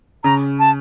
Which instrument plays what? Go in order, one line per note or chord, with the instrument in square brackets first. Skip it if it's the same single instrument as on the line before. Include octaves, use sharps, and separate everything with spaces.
[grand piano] C#3 [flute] A#5
[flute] A5